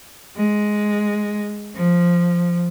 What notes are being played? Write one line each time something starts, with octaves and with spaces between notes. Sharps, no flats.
G#3
F3